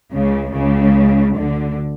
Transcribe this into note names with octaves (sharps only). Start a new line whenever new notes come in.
C#2 C#3
C#2 C#3
D2 D3